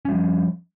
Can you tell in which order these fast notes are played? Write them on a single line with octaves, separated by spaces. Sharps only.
C#4 G3 F3